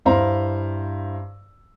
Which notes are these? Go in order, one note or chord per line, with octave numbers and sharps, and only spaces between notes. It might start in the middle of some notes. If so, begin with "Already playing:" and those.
G2 E4 C5 F5 A#5